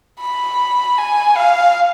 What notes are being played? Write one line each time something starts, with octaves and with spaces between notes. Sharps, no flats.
B5
G#5
F5